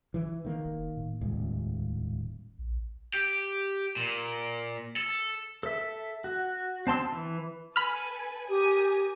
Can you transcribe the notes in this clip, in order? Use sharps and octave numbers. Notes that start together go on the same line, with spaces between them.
E3
D#3 A#3
F1
A2
D#1 C#2
A#1
G4
A#2
A4
A4 E5
F#4
C4 A5 C6 E6
E3
A4 B4 G#5 B5 F6
G4 A#4 G#5 D#6